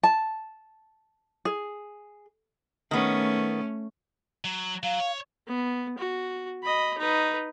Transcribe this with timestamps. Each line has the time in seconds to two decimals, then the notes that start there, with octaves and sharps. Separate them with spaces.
0.03 A5
1.45 G#4
2.91 D#3 A3 B3 C#4
4.45 F#3
4.83 F#3 F5
5.00 C#5
5.48 B3
5.98 F#4
6.63 D#5 B5
6.98 D#4 B4